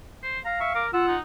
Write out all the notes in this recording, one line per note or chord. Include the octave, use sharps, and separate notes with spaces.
C5
F5 A#5
E5 C#6
A#4 D6
F4 F#5 E6
D#4